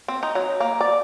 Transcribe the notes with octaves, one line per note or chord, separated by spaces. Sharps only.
C4
D#4
F#3
A#3
D5